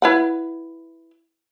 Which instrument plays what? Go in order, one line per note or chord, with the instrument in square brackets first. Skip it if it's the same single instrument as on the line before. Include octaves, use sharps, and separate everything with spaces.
[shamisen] E4 B4 F#5